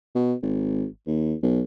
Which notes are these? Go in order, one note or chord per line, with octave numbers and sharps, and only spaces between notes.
B2
G#1
D#2
B1